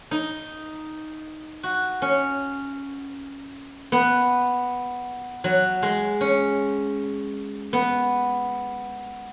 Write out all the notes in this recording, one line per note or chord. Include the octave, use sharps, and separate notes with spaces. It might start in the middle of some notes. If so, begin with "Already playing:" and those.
D#4
F#4
C#4
B3
F#3
G#3
C#4
B3